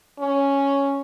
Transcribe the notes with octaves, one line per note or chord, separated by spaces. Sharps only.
C#4